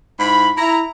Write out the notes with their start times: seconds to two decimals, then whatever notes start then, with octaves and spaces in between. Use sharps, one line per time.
0.20 G#2 E4 B5
0.57 E4 A#5